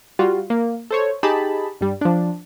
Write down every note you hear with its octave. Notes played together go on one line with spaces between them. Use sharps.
G3 F4 F#4
A#3
A4 C5 C#5
D#4 G4 G#4 A5 B5
G2 G3
F3 D4